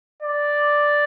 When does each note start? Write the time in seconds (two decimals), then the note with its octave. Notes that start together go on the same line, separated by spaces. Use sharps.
0.22 D5